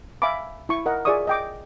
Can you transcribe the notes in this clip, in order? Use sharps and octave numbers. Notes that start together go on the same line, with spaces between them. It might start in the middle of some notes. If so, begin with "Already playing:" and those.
E5 F5 G#5 B5 D6
E4 C#6
A#4 D#5 F#5
F4 G#4 D5 E5 C#6 D#6
D#5 G5 D6